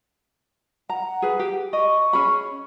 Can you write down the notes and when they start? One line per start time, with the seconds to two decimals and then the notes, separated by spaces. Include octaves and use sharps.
0.90 F#5 A#5
1.22 G#4 B4
1.39 G4
1.73 D#5 C#6
2.13 C#4 G#4 B5